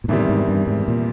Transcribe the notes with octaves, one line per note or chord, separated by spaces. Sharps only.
A#2
E2 A2 C3 D#3 G3
G#2
G2
G#2
A#2